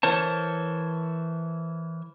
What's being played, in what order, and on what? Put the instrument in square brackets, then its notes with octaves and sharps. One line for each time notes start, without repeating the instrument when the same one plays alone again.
[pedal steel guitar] E3 A#4 C5 C#5 A5